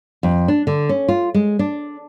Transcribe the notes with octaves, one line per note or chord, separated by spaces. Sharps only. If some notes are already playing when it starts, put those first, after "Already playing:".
F2
D4
D3
C#4
F4
G#3
D4